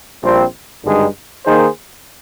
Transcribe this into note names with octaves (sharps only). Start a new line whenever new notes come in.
A#1 A#2 G3 C4
G#1 G2 D3 G#3 D#4
D#3 A#3 D#4 G#4 C5